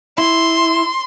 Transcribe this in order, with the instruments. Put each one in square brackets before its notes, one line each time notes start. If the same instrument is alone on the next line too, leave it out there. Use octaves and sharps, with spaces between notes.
[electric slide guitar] E4 [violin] C6